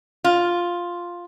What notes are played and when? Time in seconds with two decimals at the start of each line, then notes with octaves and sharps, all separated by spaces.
0.24 F4